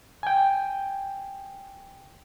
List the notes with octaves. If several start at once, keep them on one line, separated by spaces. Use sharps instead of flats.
G5 G#5